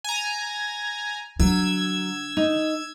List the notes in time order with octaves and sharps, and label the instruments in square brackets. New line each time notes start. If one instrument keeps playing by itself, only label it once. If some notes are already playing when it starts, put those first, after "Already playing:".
[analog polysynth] G#5 A#5
[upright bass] D3 [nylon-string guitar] F#3 [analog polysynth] E6 G#6
[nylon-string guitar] D#4